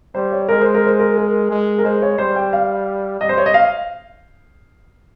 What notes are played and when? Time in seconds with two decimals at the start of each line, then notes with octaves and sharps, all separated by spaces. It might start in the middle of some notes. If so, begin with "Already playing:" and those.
0.15 G3 C5
0.32 C#5
0.49 G#3 A#4
0.61 C5
0.74 A#4
0.87 C5
0.99 A#4
1.17 A#4
1.51 G#3
1.78 A#4
1.85 G#3 C5
2.02 C#5
2.18 G3 C5
2.36 G5
2.53 F5
3.20 G3 D#5
3.29 C5
3.38 C#5
3.46 D#5
3.54 F5